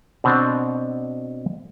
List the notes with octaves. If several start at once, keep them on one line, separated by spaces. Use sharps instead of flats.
B2 C4 D4